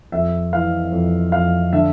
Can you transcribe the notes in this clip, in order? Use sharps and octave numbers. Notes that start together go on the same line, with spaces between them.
F2 E5
E3 F5
F2
F2 F5
D3 E5